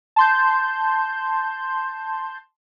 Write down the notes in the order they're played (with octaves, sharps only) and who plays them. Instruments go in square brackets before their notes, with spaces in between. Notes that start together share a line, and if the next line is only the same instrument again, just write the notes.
[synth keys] A5 C6 G6